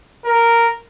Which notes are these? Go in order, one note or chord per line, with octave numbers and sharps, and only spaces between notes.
A#4